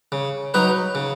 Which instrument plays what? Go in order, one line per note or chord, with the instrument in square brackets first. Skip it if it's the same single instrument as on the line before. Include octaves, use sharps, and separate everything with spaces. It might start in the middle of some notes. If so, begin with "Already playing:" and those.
[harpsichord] C#3
F#3 D#4 B4
C#3